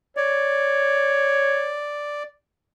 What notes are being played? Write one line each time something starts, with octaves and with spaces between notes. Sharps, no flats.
C#5 D5